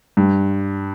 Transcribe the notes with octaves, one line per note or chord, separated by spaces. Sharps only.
G2